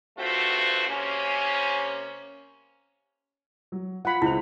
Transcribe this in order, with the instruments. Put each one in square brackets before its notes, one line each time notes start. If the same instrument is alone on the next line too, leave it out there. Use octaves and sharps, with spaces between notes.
[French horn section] G2 A3 C4 F4 F#4
C3 A#3 C#4
[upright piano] F#3
[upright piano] F4 [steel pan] F#5 B5
[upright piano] C#2 C4 F7 [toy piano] E4